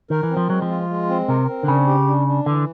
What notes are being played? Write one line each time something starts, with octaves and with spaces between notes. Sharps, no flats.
D#3 A#4
E3
C4
F3
F#3 G#3
F3
F4
G#3
C4
C3 A#4
C4
D3
C#3 D4
G4
D4
D4
D3 E3